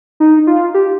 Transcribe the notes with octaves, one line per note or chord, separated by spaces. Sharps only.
D#4
F4
G4